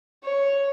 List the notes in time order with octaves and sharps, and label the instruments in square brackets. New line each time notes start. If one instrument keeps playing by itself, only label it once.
[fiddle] C#5